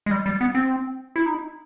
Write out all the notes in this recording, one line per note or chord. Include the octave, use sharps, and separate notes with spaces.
G#3
G3
G3
B3
C4
E4
D#4